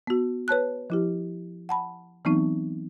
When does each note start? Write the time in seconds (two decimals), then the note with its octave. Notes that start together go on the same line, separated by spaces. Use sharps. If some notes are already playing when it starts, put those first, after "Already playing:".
0.07 B3 F#4
0.48 B4 C#5 A5 F#6
0.90 F3 E4 G4
1.69 F#5 A5 B5
2.25 E3 F#3 B3 C4 D#4